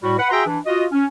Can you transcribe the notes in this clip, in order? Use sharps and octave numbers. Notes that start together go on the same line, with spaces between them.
A2 G3 F#4
B4 F#5
F#4 G#4 E5 G5 A#5 C6
E3 D4
F4 F#4 D#5
C#4